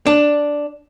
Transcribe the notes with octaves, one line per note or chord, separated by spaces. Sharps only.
D4